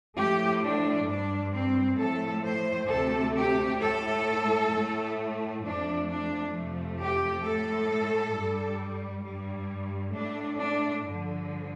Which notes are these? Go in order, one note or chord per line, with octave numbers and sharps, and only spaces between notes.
A2 F3 A3 G4
D4
G2 G3 D4
C4
A2 F3 A3 A4
C5
D2 C3 A3 A4
G4
A2 A3 A4
A2 A3
F2 F3 A3 D4
D4
F2 C3 F3 A3
G4
A2 A3 A4
G2 G3
G2 G3
A2 A3 D4
D4
G2 D3 F3